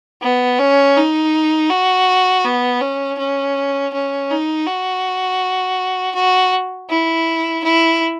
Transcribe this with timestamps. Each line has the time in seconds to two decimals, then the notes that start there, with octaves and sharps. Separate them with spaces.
0.22 B3
0.59 C#4
0.97 D#4
1.70 F#4
2.45 B3
2.81 C#4
3.19 C#4
3.93 C#4
4.30 D#4
4.67 F#4
6.15 F#4
6.90 E4
7.64 E4